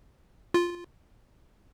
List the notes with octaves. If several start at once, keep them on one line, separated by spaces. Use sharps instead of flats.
F4